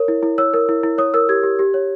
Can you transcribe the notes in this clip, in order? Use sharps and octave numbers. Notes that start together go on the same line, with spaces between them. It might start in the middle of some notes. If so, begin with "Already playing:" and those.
Already playing: A#4 C#5
E4
E4
C#5 E6
A#4
E4
E4
C#5 D#6
A#4 E6
G4 G#6
G4
G4
C#5